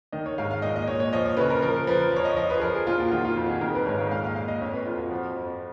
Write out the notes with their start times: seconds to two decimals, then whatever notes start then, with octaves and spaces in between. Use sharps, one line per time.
0.12 D#3 D#5
0.26 C#5
0.38 G#2 F5
0.51 F5
0.62 A#2 D#5
0.76 D#5
0.88 A#2 C#5
1.00 C#5
1.13 F3 D#5
1.25 C#5
1.37 C#3 B4
1.50 A#4
1.62 F3 A#4
1.87 F3 B4
2.12 F3 C#5
2.25 D#5
2.37 F3 D#5
2.50 B4
2.57 G#4
2.61 F3 A#4
2.74 G#4
2.87 A#2 F4
3.00 F#4
3.11 D#3 F4
3.25 F4
3.36 F2 F#4
3.50 G#4
3.61 D#3 A#4
3.75 B4
3.86 G#2 C#5
3.98 F5
4.11 A#2 F5
4.24 F5
4.36 A#2 F5
4.48 D#5
4.61 F2 C#5
4.73 B4
4.85 F2 F4
4.98 F#4
5.11 F3
5.36 F2